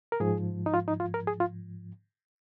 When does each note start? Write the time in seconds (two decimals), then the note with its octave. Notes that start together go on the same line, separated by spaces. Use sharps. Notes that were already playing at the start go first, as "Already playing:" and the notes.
0.12 A#4
0.20 G#2 F3 G#4
0.66 D#4
0.74 F4
0.88 D#4
1.00 F4
1.14 A#4
1.27 G#4
1.40 F4